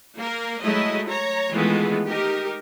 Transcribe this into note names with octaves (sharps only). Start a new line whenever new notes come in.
A#3 A#4
F#3 G#3 A3 E4 D#5
C#5 A#5
D#3 E3 G#3 A3 B3 F4
D#4 G4 A#4